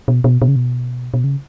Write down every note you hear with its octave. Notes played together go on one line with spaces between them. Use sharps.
B2
B2
B2
C#3
B2
B2
C#3